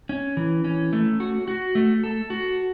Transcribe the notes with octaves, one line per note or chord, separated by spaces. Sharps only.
C#4
E3
C#4
A3
F#4
F#4
A3
A4
F#4